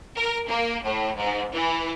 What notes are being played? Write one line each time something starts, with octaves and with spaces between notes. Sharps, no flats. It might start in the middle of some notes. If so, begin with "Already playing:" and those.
A#4
A#3
A2
G#2
E3